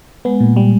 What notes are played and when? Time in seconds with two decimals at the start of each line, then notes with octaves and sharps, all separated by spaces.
0.25 G#3 B3
0.40 A#2
0.57 G3